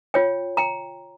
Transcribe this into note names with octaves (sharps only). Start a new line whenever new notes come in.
F4 C#5 G5
G5 A#5